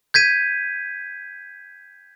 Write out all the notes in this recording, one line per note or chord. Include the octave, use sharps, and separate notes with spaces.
G6 G#6 B6 D#7